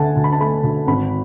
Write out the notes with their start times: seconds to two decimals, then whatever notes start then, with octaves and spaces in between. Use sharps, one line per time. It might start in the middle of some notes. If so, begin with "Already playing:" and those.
Already playing: D2 D3 A3 E5 F#5 G#5 A5
0.16 D2
0.24 B5
0.33 A5
0.40 A3 B5
0.63 D2
0.87 G#1 B5